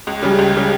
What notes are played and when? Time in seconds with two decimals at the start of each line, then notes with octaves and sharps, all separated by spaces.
0.07 C#2
0.23 C#3 G3
0.39 C#2
0.54 C#3 G3